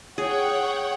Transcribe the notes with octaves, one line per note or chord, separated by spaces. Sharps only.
G#4 C#5 F#5 G5